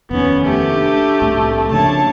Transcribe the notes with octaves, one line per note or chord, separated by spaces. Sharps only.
F1 D#2 B3 C#4
A3 G4
D4
C2 A2 C3
C#3 F3 A#3 D4 C#5 A5